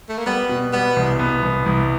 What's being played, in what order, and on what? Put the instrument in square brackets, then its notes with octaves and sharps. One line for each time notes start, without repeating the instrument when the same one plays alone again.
[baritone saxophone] A3
A#3
[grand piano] G3 [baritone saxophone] B3
[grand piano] B2
[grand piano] G3 [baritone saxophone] B3
[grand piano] C2
B3
C2
C2